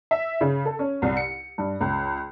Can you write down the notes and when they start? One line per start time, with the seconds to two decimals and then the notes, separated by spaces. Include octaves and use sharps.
0.11 E5
0.41 C#3
0.65 A4
0.79 C#4
1.02 C2
1.17 C#7
1.58 G2
1.81 C#2